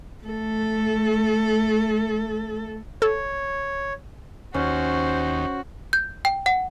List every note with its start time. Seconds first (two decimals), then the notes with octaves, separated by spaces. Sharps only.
0.24 A3 A4
3.02 A4 C#5
4.54 D#2 C#4 F#4 C5
5.93 G6
6.25 G5
6.46 F#5